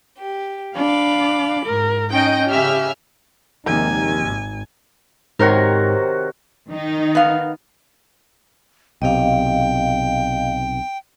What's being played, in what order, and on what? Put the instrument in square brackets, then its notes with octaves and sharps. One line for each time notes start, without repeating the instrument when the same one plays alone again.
[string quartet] G4
[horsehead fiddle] D4 [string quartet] F5 B5 D6
[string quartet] G#2 [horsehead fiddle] A#4
[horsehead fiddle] C#4 D#4 [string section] D#5 G5
[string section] C#3 E5 F6 [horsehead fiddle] G4 [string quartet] G#5
[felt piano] A#1 C3 [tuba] D#2 [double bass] D#3 G#3 [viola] G#5
[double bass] G#1
[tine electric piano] G#2 [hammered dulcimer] C3 D#3 F#4 [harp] A#4 C5 C#5
[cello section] D#3 D#4
[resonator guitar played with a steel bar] B3 F5
[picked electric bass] B1 C3 [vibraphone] D#5 F5 [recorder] G5